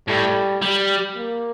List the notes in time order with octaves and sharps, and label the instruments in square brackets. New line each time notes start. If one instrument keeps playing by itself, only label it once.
[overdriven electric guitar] A2 [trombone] G3
[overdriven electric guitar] G3
[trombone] A#3